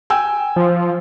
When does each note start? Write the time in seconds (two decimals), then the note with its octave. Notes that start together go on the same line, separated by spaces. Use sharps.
0.10 G5 G#5 E6
0.56 F3